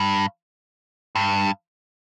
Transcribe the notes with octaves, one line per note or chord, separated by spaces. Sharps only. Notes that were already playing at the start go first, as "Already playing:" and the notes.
Already playing: G2
G2